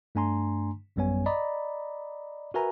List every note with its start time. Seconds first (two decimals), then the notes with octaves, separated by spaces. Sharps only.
0.15 G2 A3 D4 G#5 A#5 C6
0.96 A1 F#2 G3 B3 C#5 G#5
1.26 D5 D#5 A#5 B5
2.54 F#4 A#4 B4 E5 G#5 A#5